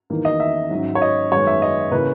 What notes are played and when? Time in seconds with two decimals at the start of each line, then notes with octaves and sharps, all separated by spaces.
0.10 E2 D#3 A#3
0.25 D#5
0.40 E5
0.71 G#2 F#3 C#4
0.95 C#5
1.02 D#5
1.31 F#2 D#3 G#3 B3 C#5
1.47 E5
1.62 D#5
1.91 C#3 E3 A#3 C#4 B4